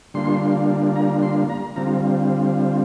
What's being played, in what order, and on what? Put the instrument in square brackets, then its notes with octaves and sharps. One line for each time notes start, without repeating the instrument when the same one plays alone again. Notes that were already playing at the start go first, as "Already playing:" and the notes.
[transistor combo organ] D3 G3 A#3 D4 F4 C6
A#5
C6
A#5
D3 G3 C4 F4 A#5